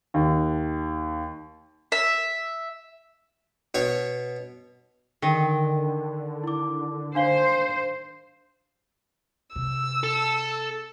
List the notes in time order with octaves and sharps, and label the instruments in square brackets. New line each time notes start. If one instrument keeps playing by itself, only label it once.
[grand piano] D#2
[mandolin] E5
[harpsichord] B2 C#5 C#6
[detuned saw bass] D3 [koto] D#3 [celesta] A#4 G5
[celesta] E4 D6
[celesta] D4 F5 G7 [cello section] C5
[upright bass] C3 [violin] E6
[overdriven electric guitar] A4